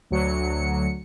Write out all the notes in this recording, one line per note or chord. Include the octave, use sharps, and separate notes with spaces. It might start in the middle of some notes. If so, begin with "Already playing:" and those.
D2 F#3 C#7